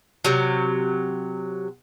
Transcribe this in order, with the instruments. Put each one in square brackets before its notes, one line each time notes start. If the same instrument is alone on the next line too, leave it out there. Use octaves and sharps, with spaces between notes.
[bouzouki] C3 F#3